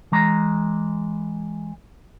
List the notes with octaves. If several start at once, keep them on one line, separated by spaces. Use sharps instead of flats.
E3 G#3 A#5